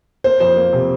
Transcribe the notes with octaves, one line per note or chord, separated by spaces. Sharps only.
A#3 C5
F2 C5
A#3
C3